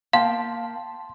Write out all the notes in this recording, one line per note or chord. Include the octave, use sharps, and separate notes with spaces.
A#3 F5 G5 A5 C6